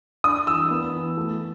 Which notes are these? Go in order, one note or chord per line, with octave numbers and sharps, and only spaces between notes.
D4 D#6
E3 E6
B3
E3
A3